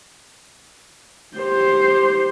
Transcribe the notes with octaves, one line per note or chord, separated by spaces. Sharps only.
G4 C5